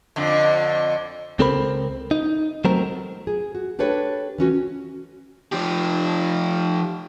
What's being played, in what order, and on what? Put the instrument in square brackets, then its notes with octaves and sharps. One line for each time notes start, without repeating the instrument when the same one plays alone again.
[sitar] F2 D3
[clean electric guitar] C#2 C4 A4 A#4 C5 B5
D#4
F#3 A3 C4 A#4
[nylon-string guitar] G#4
F#4
D4 G4 A4 B4 C#5
E3 C#4 F#4
[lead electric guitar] F3 G4